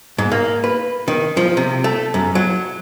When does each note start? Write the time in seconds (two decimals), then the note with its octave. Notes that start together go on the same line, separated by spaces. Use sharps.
0.18 G#2
0.32 A#3
0.64 B4
1.08 D#3
1.37 F3
1.57 C3
1.84 A3
2.14 F#2
2.35 F#3